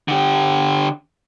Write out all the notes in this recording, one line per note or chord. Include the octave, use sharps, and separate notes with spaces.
D3 G4